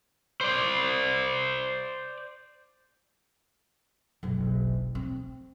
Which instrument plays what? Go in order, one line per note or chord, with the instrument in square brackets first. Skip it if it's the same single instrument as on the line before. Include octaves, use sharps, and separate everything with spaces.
[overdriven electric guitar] C5 D5
[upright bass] F#1 B1
C4